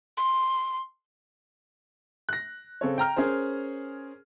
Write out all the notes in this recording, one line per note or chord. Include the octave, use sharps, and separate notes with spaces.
C6
F#6 A#6
C#3 C4 A4 C#5
G5 A#5 F6
C#4 G#4 A#4 C5